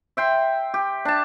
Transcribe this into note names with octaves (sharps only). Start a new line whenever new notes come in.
E5 G5 C6
G4
D4 A5